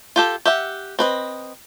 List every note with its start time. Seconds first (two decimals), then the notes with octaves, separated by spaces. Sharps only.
0.16 F4 G4 A4
0.45 G4 E5 F#5
0.99 C4 B4 D#5